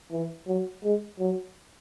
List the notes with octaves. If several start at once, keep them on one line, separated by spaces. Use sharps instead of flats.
E3
F#3
G#3
F#3